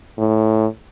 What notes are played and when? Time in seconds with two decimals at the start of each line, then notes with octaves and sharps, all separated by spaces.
0.18 A2